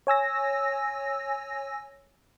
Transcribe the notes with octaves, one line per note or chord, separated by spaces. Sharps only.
C#5 G#5 E6 A#6